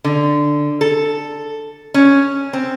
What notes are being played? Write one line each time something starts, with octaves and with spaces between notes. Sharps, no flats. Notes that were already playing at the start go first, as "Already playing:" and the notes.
D3
A4
C#4
C4